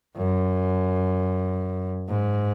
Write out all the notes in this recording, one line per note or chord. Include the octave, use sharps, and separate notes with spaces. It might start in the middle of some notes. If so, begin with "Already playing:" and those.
F#2
G#2